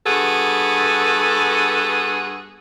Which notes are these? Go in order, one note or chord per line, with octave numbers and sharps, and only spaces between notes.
G2 B3 F#4 G#4 A4